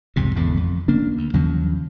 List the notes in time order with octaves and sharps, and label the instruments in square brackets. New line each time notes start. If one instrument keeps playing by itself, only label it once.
[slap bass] C2 F2 G#2 C3
G#1 E2 D3
F2
C#3 A#3 D4
D2
D#2 C#3 F3 F#3